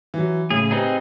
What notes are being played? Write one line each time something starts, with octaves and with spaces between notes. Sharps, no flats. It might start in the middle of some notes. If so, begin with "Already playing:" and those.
E3 F#3
A2 C#3 G#4
C4 D#4 G4 G#4 B4